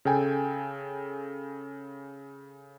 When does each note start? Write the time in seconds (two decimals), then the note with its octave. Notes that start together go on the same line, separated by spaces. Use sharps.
0.05 C#3 A4 G5 G#5